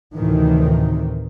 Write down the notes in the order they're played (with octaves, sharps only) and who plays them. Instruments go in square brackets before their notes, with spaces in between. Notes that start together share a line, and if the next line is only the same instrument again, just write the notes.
[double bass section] D2 A2 C3 D#3 E3